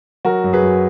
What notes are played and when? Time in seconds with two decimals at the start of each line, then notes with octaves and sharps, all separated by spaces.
0.25 F#3 F#4 A#4
0.44 F#2
0.53 G#4 B4
0.62 F#2